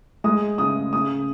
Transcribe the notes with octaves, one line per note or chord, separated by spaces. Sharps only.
G#3 D#6
C#3 D#6
C#3 D#6